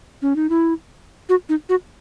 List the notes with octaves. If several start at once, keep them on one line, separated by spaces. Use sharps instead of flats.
C#4
D#4
E4
F#4
D#4
F#4